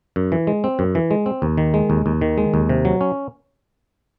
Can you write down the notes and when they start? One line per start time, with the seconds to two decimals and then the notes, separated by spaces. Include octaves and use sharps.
0.16 F#2
0.32 E3
0.47 G#3
0.64 C4
0.79 F#2
0.95 E3
1.11 G#3
1.26 C4
1.42 D#2
1.58 D#3
1.74 G#3
1.90 D#2
2.06 D#2
2.21 D#3
2.38 G#3
2.54 D#2
2.69 C3
2.85 F#3
3.01 C#4